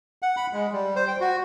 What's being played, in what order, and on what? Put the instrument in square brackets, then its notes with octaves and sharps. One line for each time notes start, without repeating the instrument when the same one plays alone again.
[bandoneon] F#5
B5
G#3
G3
C5
G5
F#4